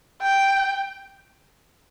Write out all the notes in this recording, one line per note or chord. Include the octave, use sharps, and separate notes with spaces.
G5